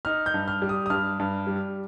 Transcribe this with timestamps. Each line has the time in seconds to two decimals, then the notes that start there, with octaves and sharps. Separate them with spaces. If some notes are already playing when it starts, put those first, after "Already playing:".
0.05 D#4 F6
0.26 G6
0.34 G2
0.48 F6
0.62 G3
0.69 D#6
0.86 D#6
0.90 G2 F6
1.19 G2
1.47 G3